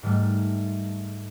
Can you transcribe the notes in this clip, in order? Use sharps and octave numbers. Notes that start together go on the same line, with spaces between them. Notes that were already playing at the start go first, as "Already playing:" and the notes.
G#2 D#3 G3 A3